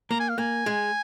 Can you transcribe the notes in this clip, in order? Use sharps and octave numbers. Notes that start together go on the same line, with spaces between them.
A#3 A#5
G#5
F5
A#3 G#5
G#3